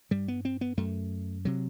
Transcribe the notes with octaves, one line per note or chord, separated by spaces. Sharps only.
G2 G3
B3
C4
B3
F#2 A3
C3 F#3